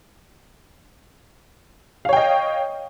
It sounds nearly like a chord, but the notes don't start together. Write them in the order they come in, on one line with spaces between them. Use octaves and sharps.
F5 C#5 G5 D#5